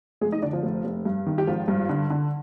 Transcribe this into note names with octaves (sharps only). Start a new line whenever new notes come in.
F1 G#3 G#4
D#4 D#5
D3 D4 D5
F3 F4
F1
F1
G2
D#3
G4
G#1 F3 F4
G2
D3
D3